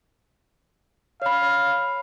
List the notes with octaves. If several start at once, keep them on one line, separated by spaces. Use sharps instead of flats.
C#5 F5 B5